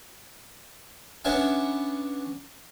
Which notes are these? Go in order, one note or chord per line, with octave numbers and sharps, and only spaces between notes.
B3 C#4 D4 E5 G#5